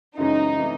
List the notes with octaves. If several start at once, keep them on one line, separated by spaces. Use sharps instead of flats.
F#2 C#3 E3 G#3 C#4 D#4
C3 E3 A3 C#4